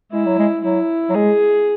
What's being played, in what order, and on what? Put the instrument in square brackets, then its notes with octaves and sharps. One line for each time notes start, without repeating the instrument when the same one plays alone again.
[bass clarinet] G#3 [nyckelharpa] E4
[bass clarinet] F#3
G#3
[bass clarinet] F#3 [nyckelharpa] E4
[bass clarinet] F#3
[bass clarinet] G#3 [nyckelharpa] G#4